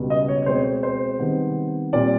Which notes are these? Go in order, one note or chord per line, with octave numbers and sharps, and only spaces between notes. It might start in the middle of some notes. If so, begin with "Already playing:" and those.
Already playing: C#2 B2 G3
D#5
C#5
C#5
B2 G#3 C4 C5
C5
C3 D#3 G3 B3
A#2 G3 C4 D5